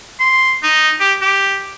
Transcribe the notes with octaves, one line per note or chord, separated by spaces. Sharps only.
C6
D#4
G4
G4